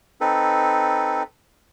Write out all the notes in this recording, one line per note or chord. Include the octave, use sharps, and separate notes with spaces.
C4 D#4 A4 B4